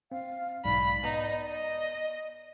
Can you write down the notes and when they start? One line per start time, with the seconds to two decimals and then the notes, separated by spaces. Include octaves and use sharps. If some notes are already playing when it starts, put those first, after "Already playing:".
0.12 C4 F5
0.65 B1 G#2 D5 B5
1.04 B3 D#4
1.44 D#5